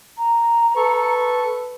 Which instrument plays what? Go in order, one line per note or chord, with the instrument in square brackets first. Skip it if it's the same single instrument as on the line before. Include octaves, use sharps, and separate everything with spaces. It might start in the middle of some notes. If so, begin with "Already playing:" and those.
[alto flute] A#5
[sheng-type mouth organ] A4 C#6 [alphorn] B4